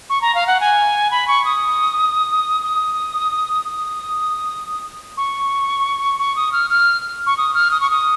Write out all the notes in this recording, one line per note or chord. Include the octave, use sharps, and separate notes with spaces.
C#6
A#5
F5
F#5
G#5
B5
C#6
D#6
D#6
D#6
C#6
C#6
D#6
F6
F6
C#6
D#6
F6
D#6
C#6
D#6